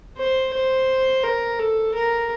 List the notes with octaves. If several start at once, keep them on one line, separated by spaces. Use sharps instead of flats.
C5
C5
A#4
A4
A#4